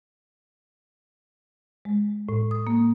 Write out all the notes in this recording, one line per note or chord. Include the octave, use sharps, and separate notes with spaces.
G#3
A2
D#6
A#3